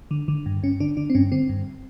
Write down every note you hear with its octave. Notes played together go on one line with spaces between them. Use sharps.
D3
D3
G2
G2 C#4
D3 D4
D3 D4
C4
G2 C#4
D3 C4
G2